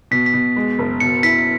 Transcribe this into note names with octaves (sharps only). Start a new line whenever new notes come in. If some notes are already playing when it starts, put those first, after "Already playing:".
B2 B6
B6
B2
G#3
F#1
B2 C#7
E4 B6